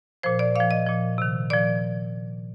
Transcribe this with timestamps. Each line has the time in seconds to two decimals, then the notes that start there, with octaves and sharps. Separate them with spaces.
0.23 A#2 F3 C5
0.39 D5
0.55 A#2 F3 F5
0.71 D#5
0.87 A#2 F3
1.18 C3 D#3
1.50 A#2 F3 D5